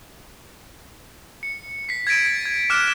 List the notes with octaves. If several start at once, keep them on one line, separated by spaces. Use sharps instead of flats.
C#7
B6 C7
G#6 A6 B6 D7 D#7
G#6
D6 F6 F#6 D7 E7